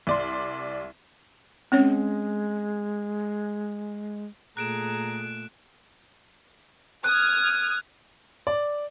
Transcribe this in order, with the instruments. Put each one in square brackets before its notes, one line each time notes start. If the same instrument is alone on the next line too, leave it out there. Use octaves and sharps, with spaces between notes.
[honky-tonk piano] C2 D5 C6
[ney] G#3 [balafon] C4 C#4 C#5
[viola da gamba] A#2 A3 [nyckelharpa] G#4 A4 [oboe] A#5 [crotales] F#6 D7 E7
[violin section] D#6 F6 G#6 [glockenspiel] F#6
[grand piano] D5